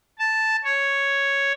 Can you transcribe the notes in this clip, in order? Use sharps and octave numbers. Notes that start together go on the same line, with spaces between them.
A5
C#5